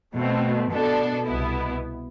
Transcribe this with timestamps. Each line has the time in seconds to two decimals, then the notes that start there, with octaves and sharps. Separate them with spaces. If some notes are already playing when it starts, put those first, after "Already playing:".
0.14 B2 A3 C4
0.70 B2 B3 D4 A4
1.27 C2 B2 B3 E4